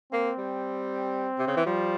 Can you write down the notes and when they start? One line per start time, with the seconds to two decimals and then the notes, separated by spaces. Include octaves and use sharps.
0.12 A#3 C4
0.38 G3
1.39 C3
1.48 C#3
1.57 E3
1.66 F3 G3